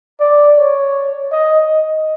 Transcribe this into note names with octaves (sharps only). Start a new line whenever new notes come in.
D5
C#5
D#5